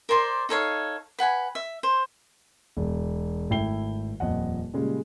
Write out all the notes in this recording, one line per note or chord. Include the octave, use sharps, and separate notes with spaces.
A#4 C5 D5 C6
D#4 A4 C#5 F5
B4 F#5 G#5 B5
E5
C5
E1
G#1 A3 E4 G5 C7 G7
D#1 F2 D#5 F#5
A#2 C#3 G3 G#3